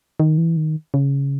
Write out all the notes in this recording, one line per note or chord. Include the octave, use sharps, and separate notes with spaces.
D#3
E3
D#3
C#3